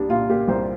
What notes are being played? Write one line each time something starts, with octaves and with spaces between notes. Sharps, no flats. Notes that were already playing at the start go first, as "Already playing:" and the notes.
Already playing: C2 G3 A#3 D4
A#2 F4
A#3 G4
C2 C5